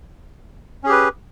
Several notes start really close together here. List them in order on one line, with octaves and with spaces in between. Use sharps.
C#4 G#4 G4 B4